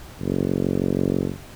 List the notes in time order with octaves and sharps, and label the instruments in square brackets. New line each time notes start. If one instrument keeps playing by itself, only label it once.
[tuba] F#1